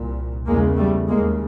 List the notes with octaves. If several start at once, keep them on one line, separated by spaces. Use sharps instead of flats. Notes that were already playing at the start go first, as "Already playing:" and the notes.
Already playing: C2 A#2
E2 C#3 G#3 A#3
G3 A3
D#2 C#3 G#3 A#3